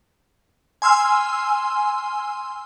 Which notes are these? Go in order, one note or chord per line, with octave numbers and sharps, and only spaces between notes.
G#5 C6 E6 F6